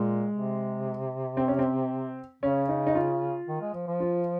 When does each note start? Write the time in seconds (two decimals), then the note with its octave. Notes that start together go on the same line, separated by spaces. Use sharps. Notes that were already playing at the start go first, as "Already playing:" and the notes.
Already playing: A#2 G#3
0.32 C3
1.37 C4
1.48 C#4
1.59 C4
2.43 C#3 C#4
2.69 D#4
2.87 D#4
2.95 F4
3.48 D#3
3.61 G#3
3.74 F3
3.87 F3
4.00 F4